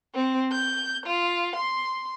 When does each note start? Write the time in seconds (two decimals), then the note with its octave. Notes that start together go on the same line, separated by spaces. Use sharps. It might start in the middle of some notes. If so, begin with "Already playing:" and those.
0.14 C4
0.51 G6
1.07 F4
1.56 C6